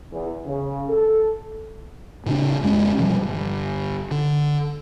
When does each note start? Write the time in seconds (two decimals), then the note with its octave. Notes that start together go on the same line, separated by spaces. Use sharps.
0.11 E2
0.46 C#3
0.89 A4
2.26 A2 C#3 D4
2.63 F2 G#3 C#4
2.97 B2 E3 F3 G3
3.23 G1
4.11 D3